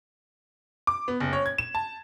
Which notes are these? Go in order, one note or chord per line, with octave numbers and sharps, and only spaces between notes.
D6
B3
F#1
C#5
G#6
E7
A5